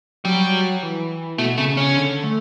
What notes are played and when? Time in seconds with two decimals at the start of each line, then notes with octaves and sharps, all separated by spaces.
0.25 F#3 G3
0.83 E3
1.38 B2 A3
1.58 C#3 A3
1.77 C#3 C#4
1.96 D3
2.23 A3